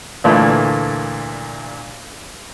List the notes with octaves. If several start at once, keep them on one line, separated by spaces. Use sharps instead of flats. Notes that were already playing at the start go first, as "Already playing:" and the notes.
D2 A#2 E3 A3